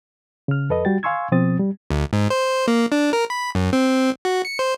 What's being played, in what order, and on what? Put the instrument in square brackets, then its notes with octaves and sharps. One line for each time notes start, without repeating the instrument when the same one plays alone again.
[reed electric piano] C#3 F6
F2 A4 B4 D#5
G3 F#4 G5 A6
F5 G#5 C6 C#6 E6 G#6
B2 F3 C4 D#6 A6
G3
[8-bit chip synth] D2
G#2
C5
A#3
D4
A#4
B5
F#2
C4
F#4
C#7
C5